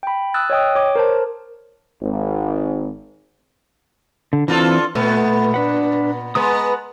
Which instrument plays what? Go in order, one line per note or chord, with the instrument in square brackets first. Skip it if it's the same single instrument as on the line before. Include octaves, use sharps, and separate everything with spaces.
[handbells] G5 B5
D#6 E6 F#6 A6
C#5 D#5 G5 D#6
C#5 D6
A#4 C5 A5
[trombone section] G#1
[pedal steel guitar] D3
[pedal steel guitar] E3 C4 [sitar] D4 F4 A4
[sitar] A#2 B3 [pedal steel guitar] A3
[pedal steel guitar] D4 B4 F#5
[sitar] G#3 B3 [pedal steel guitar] B4 A#5 D#6